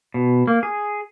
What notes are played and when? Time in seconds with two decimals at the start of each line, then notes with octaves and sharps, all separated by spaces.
0.14 B2
0.48 A#3
0.63 G#4